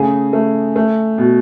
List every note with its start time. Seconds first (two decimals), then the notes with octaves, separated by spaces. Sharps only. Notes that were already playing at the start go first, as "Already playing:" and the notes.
Already playing: C#3 A3 G#4
0.33 A3
0.76 A3
1.18 B2